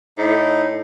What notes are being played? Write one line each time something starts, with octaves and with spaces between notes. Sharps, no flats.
A2 D#4